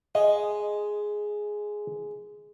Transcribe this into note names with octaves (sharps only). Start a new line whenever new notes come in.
G#3 D#5